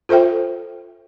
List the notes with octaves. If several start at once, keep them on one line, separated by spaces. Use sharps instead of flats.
F4 A4 C5 E5 G5